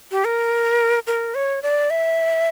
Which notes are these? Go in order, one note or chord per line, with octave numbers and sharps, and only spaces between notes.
G4
A#4
A#4
C#5
D5
E5